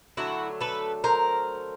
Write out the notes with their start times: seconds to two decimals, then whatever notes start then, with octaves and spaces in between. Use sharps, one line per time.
0.17 D3 F#3 A3 E4 F#4
0.61 A4 B4
1.04 A#4 C5